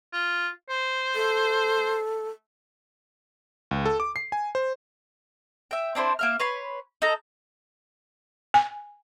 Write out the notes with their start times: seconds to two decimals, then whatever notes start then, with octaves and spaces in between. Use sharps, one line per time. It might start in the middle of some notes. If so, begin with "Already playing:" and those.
0.13 F4
0.69 C5
1.15 A4
3.71 C#2
3.86 A4
4.00 D6
4.16 C7
4.32 G#5
4.55 C5
5.71 E5 G5
5.95 C4 D4 E4 C5
6.19 A#3 E5 F6
6.40 B4 C#5 C6
7.02 D#4 A4 A#5
8.54 G#5